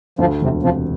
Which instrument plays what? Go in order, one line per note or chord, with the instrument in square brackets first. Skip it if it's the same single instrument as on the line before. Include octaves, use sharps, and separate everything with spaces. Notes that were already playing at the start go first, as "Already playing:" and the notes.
[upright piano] D2 [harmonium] F3
[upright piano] E1 [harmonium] C3
[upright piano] C3 [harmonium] F3